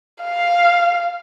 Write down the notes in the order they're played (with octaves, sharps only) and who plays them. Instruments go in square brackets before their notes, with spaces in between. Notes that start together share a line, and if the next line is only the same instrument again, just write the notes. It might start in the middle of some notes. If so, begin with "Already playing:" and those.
[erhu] F5